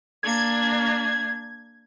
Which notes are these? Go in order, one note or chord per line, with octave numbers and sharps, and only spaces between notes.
A#3 D4 G#6